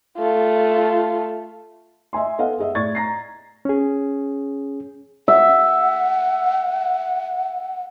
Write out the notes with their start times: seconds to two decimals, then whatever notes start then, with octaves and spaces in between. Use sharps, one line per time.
0.18 A3 F4
2.13 D#5 E5 G#5 C6
2.38 B3 A4 D#5 F5 F#5
2.59 G#4 D#5 E5
2.75 A2 D5 C#6 G#6 A6
2.95 A#5 A#6 C7
3.65 C#4 G#4
5.28 E5 F#5